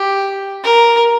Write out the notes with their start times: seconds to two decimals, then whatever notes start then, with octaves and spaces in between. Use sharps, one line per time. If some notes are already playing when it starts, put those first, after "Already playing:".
Already playing: G4
0.64 A#4